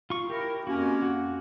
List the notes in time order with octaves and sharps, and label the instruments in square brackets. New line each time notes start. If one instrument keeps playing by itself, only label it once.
[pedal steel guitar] F4 C#6
[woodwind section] E4 A#4 [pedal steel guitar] G4
[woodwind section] F2 A#3 C#4 [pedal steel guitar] F#4
[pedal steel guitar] F#4